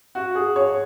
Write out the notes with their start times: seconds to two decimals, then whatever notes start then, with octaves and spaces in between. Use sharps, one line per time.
0.15 F#4
0.35 G#4
0.56 C#5